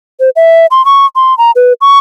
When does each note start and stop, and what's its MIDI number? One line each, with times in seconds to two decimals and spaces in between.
0.20 0.30 72
0.36 0.66 76
0.71 0.85 84
0.85 1.06 85
1.16 1.37 84
1.38 1.51 82
1.56 1.73 71
1.81 1.99 85